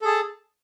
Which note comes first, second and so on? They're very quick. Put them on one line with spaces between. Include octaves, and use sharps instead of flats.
A4 G#4 A5